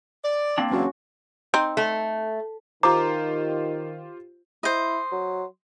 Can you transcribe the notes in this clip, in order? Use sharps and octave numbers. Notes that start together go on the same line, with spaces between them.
D5
A#3 C4 D4
E2 C#3 F#3 C#4 F#4
C4 D#4
A3
D#3 F4 G4 C5 A#5 D6
E4 C5 D#5
F#3